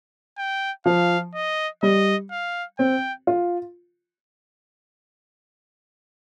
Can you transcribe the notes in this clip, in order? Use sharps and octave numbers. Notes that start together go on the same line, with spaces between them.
G5
F3 F5
D#5
G3 D#5
F5
C4 G5
F4